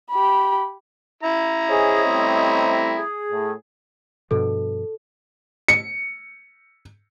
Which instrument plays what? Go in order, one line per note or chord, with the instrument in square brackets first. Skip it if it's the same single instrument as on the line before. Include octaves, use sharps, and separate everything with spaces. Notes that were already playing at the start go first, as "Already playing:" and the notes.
[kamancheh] G4 B5
[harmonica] E4 A#5
[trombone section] G#4 [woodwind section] C5 C#5 D#5
[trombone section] G3 A3 C4
[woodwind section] G#4
[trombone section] A2
[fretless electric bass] G2 B2 F3 [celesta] A4
[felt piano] C#7